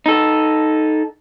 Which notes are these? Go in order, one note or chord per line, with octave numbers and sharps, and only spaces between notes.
D#4 A4